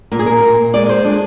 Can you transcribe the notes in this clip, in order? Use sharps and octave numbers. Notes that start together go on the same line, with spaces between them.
A#2 A#4
G#4
A#4
A#2
G#3 D5
A#4
C5
G#3 D4